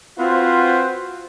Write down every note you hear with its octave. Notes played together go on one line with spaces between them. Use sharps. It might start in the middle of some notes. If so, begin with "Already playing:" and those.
C4 F4 F#4 B4 C5